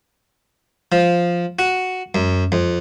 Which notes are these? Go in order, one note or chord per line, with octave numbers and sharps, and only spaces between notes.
F3
F#4
F#2
F2